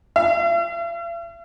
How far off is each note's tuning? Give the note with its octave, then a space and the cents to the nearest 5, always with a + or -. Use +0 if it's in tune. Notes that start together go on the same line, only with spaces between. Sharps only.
E5 +45